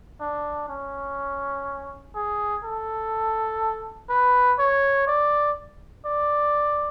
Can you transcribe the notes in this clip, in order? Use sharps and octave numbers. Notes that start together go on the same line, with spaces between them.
D4
C#4
G#4
A4
B4
C#5
D5
D5